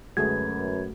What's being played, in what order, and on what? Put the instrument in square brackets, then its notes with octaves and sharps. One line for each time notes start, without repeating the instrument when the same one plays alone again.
[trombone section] F#2 B4 [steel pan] D3 G#3 G#4 [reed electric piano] A3 F#4 [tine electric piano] G#6